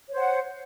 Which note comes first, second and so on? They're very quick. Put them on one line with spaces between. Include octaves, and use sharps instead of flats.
C#5 C5 F#5